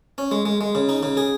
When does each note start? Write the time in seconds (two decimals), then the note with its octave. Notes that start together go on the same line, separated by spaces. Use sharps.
0.18 C#4
0.31 G#3
0.45 G#3
0.61 G#3
0.75 C#3
0.89 D#4
1.03 C#3
1.17 G#4